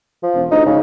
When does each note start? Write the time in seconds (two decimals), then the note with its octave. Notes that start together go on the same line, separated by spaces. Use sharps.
0.23 F3
0.34 E1
0.51 D2 D#4
0.66 G#2 C#3